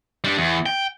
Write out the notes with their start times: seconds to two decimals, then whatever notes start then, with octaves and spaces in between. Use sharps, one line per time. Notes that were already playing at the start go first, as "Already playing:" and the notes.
0.24 G3 D4
0.38 E2
0.66 G5